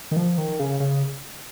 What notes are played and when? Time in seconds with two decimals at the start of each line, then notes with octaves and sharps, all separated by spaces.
0.11 D#3
0.16 F3
0.38 D#3
0.59 C#3
0.80 C#3